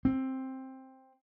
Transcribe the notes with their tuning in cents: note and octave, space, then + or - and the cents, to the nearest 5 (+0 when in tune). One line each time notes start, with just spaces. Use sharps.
C4 +10